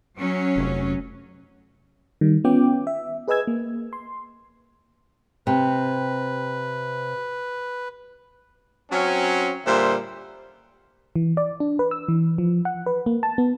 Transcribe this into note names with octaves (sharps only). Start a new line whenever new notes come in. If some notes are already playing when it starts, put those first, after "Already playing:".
F#3 C#4
F1
D#3 G3
B3 C#4 F4 G5 D6
E5
G#4 B4 D#5 G#5 E6 G#6
A#3
C6
C3 B4
F#3 C4 C#4
A#2 D3 G3 C5 E5
E3
D5
D4
B4
E6
E3
F3
F#5
B4
A#3
A5
B3